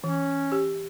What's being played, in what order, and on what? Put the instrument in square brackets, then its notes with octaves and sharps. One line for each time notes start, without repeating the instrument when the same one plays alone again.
[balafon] E3 [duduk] C#4
[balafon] G4